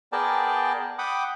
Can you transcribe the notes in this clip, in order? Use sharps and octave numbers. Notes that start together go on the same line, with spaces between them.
B3 G#4 A#4 D5 G5 A5
F#5 G5 B5 D6 D#6